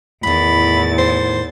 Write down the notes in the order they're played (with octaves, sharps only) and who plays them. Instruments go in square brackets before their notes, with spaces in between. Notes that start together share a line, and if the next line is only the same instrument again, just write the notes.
[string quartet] E2 A6 [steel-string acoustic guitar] A2 D#3 [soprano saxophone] B5
[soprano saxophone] C5